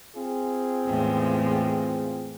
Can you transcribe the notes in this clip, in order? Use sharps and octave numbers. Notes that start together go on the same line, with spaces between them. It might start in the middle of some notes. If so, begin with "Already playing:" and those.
C4 F4 G#4
E2 A2 G#3